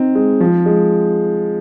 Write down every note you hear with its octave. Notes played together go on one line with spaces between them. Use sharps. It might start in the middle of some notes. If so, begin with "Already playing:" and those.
Already playing: C4 D#4
G#3
F3
G#3